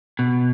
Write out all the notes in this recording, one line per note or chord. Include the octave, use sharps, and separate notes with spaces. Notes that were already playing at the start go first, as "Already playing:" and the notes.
B2